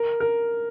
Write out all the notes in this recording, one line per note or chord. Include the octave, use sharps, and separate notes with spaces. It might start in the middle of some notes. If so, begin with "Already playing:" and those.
Already playing: A#4
A#4